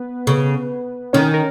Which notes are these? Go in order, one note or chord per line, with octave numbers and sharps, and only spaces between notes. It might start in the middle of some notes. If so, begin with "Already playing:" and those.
Already playing: B3 B4
C#3
D#3 C#4 C#5
A#4